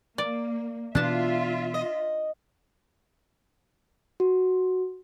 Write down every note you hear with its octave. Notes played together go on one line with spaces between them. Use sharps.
A#3 D5
B2 E3 B3 D4 F4 E5 A5
D#5
F#4